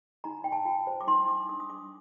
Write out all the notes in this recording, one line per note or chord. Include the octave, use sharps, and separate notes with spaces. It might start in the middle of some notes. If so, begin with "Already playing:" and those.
D#4 A#5
D#4 G5
A5
F4 G5
C5 A5
D6
D#4 C6
D#4 D6
D4 D#6
D#6
D4 D6